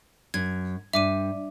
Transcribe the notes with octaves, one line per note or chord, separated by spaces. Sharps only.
F#2 G#6
G2 E5 D6 D#7